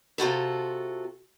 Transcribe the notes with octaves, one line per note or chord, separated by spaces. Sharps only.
C3 F4 F#4 A4